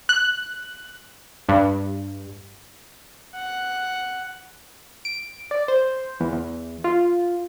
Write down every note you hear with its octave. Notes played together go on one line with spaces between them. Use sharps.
F#6
G2
F#5
D7
D5
C5
E2
E2
F4